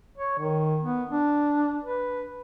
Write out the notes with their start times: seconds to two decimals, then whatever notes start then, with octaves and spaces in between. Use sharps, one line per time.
0.18 C#5
0.38 D#3
0.83 B3
1.11 D4
1.84 B4